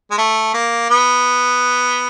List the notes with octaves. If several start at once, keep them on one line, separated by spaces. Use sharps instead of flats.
G#3
A3
A#3
B3